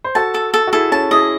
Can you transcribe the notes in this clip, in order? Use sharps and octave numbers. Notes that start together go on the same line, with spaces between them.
C5
F#4 A4 A5
A4
A4
F#4
E4 G#4 A4
C#4 E4 A5
E4 G#4 D#5